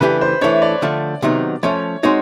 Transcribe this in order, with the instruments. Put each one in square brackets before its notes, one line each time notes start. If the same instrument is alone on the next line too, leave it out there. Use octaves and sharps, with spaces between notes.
[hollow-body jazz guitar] C#3 E3 A3 D4 G4 [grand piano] B4
[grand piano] C5
[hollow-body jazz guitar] E3 A3 D4 [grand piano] C#5
[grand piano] D5
[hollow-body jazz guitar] D3 F3 A3
C3 D#3 F#3 B3 D#4
[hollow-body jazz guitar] F3 A3 C#4 [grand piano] C#5
[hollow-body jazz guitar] G#3 C4 D#4 F#4 [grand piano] C#5